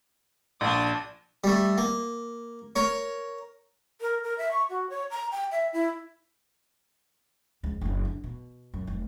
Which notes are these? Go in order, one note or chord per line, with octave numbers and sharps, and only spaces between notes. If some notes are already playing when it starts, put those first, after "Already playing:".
A#1 D4 D#6
G3 A3
A#3
A#4 C#5
A#4
A#4
E5
C#6
F#4
C#5
A#5
G5
E5
E4
C#2 F3
F#1 F#2
D3
B2
F#2
F1